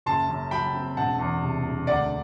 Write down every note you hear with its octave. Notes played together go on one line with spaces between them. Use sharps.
F#1 A5 C6
F#2
F#3 G5 B5
C4
E1 F#5 A5
E2
C3
E1
D2 D5 F#5